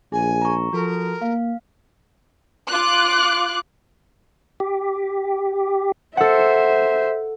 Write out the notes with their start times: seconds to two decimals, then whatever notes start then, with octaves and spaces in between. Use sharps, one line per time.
0.12 A#1 G#4 G#5
0.42 A#5 C#6
0.73 F3 F#4 A4 A#4
1.22 A#3 F5
2.71 F4 D6 F#6
4.60 G4
6.17 A4 C5 E5 F#5